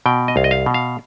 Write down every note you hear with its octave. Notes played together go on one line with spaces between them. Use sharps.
B2 G5
D#5
C2 F5
D#5
F5
B2
F5